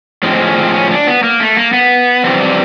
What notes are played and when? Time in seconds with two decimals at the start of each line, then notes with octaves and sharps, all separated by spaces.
0.23 A2 F3 G#3 C4
0.47 C#4
0.56 C4
0.74 C#4
0.91 D4
1.07 B3
1.24 A#3
1.40 A3
1.57 A#3
1.73 B3
2.24 F2 C3 E3 G3 C4
2.40 D4